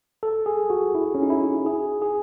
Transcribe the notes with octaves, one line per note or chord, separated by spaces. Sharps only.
A4
G#4
F#4
E4
C#4
D#4
E4
G#4
G#4